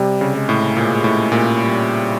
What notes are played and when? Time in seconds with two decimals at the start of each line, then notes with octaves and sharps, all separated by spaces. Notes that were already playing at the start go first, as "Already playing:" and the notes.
Already playing: C3 G3
0.21 C#3
0.35 G#3
0.49 A2
0.76 A#2 G#3
1.04 A2
1.32 A#2
1.59 G3